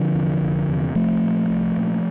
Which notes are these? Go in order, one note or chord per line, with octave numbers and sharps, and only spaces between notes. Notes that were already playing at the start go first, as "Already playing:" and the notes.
Already playing: D3 F3
E2 C3
F1
E2 C3
C2 F3 A3
A#2
C2
A#2